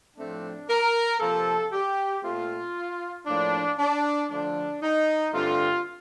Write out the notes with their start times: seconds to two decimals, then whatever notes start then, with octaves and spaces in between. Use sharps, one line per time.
0.17 A2 F3 A3 C4 D4
0.69 A#4
1.20 C3 F3 A#3 A4
1.72 G4
2.23 A#2 A3 C4 F4
3.26 A2 F3 A#3 D4
3.79 D4
4.30 D3 F3 A3 D4
4.81 D#4
5.32 G2 D3 A3 C4 F4